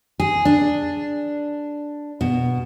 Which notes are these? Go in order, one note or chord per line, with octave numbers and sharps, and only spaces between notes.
G#4
D4
B2